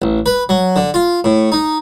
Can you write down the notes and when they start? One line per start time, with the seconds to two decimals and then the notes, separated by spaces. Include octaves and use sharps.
0.02 A1
0.26 B4
0.49 F#3
0.76 D3
0.94 F4
1.24 A2
1.52 D#4